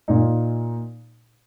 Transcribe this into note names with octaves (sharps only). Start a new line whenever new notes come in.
A#2 A#3 D#4